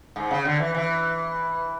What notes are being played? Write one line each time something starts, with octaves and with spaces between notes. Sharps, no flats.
G#2
C#3
D3
E3
E3